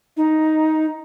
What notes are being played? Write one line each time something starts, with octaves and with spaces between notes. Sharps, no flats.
D#4